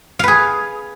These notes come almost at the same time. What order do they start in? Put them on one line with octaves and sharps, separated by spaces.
F5 B4 G#4